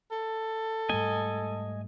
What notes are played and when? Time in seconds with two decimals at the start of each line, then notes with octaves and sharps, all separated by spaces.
0.11 A4
0.89 G#2 G3 A3 D#5 G#5